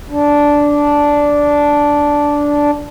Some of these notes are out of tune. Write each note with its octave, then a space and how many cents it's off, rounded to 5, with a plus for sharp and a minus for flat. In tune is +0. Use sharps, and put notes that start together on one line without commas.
D4 -10